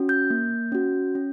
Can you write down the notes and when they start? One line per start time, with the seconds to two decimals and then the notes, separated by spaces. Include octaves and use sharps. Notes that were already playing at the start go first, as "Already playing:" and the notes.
Already playing: C#4 F#4
0.09 G6
0.30 A#3
0.72 C#4 F#4
1.15 C#4